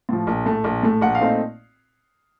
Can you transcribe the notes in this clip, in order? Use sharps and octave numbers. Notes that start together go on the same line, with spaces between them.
A2 F3
A#1
A2 A3
A#1
A2 A3
A#1 F#5
F5
A#2 A3 C4 D#4